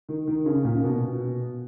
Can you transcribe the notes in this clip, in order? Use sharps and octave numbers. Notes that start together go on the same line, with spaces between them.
D#3
D#3
C#3
A#2
B2